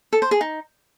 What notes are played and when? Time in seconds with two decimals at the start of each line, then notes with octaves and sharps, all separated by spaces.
0.13 A4
0.22 C5
0.31 G#4
0.41 D#4